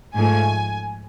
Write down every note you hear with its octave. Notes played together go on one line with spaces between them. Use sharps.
G#2 F3 A3 G#5